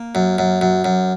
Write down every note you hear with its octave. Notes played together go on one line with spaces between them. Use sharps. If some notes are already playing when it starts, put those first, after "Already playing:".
Already playing: A#3
F#2
F#2
F#2
F#2